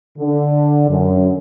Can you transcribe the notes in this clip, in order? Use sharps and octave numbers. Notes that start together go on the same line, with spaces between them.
D3
F#2